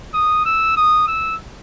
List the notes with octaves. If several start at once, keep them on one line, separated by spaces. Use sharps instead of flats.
D#6
E6
D#6
E6